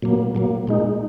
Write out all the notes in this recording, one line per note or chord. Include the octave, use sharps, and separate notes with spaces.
A#2 F#3 A#3
A#2 F#3 A#3
A#2 G#3 D#4